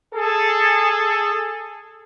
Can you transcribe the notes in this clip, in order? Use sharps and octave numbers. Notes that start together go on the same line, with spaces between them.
G#4 A4